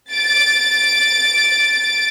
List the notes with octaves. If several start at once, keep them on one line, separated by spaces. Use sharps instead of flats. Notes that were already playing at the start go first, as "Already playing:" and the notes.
A6 D7